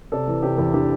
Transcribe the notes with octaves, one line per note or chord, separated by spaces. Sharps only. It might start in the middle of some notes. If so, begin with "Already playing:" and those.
C3 A4 D5
E3
C3 G4 C5
E2 E4 A4
E3 D4 G4